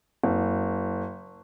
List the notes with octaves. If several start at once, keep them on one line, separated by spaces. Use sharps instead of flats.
F#1